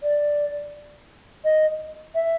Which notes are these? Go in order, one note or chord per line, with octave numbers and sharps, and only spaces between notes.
D5
D#5
E5